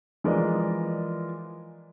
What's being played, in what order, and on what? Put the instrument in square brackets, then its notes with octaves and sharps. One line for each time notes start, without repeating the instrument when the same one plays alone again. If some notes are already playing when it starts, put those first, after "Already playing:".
[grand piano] E3 F3 G#3 A#4 D5 D#5